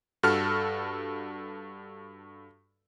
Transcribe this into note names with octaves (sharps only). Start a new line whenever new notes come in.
G2 F#4 A4 F6